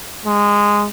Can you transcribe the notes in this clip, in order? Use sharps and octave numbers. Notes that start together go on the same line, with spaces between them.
G#3